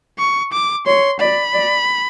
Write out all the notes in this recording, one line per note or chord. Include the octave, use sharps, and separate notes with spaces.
C#6
D6
C#5 C6
D5 B5
D5